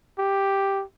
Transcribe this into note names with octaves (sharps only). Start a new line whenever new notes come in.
G4